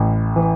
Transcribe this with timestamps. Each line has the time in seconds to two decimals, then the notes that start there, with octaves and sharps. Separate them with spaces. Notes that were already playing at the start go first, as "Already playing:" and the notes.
Already playing: A1 A2
0.36 E3